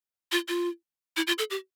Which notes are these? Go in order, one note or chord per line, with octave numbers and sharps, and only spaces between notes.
F4
F4
E4
F4
A4
G4